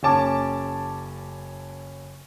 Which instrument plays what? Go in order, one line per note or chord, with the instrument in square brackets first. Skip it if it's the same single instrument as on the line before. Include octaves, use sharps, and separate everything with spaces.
[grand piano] F#1 C#4 A5 D6